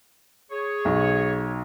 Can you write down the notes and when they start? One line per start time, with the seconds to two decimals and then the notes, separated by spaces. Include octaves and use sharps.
0.51 G#4 C#5
0.85 B1